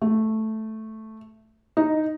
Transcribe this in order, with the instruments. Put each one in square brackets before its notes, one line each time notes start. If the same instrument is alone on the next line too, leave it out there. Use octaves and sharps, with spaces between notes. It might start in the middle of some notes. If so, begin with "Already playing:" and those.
[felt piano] A3
D#4